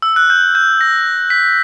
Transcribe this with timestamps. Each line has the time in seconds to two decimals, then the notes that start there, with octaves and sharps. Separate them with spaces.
0.02 E6
0.16 F#6
0.30 G6
0.55 G6
0.81 A#6
1.30 B6